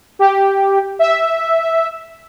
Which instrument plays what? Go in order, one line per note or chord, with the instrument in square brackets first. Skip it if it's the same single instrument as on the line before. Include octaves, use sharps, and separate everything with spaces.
[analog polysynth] G4
E5